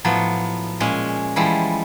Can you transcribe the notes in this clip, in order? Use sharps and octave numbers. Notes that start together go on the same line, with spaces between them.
A2 F3 F#3 B3
A#2 G#3 C#4
E3 F3 G3 G#3 E4